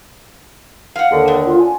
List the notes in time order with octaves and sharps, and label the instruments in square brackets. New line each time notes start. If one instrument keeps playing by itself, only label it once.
[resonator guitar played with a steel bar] F5 F#5
[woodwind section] D#2 D3
[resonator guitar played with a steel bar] B3
[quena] F4
G#5